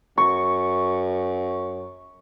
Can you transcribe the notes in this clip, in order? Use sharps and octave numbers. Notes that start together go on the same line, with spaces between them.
F#2 C#6